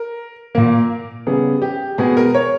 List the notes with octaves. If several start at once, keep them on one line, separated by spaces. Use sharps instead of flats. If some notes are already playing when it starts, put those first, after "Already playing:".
Already playing: A#4
A#2 A#3 A#4
C#3 G3 B3 G#4
G4
B2 G#3 B3 G#4
A#4
C#5